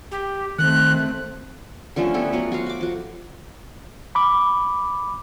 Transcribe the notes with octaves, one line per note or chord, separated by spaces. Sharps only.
G4
D#3 A3 C4 F#6
D3 F3 A3 C#4
B3 E4 G4 A4
F3 F#3 B3
F#4 C5 F5
F#4 D6
F3 F#4
B5 D6